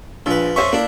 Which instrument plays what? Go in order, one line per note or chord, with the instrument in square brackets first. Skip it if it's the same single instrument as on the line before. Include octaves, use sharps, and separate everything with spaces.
[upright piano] A#1 [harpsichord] F3 B4
[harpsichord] F2 C#4 E5 [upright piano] C5 C#6
[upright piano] A#3 [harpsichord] D4 E4